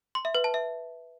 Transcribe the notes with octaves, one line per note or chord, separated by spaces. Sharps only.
C6
E5
B4
A5
E5